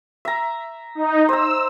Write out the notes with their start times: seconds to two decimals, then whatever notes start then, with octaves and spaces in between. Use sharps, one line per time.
0.25 E5 A#5
0.95 D#4
1.29 C5 A#5 E6